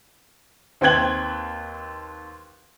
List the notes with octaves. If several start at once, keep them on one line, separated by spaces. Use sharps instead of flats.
D#2 C4 B4 G5 G#6 F#7